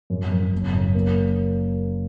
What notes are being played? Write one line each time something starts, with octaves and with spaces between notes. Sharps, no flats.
F#2
F#2
F#1
F#2
A#3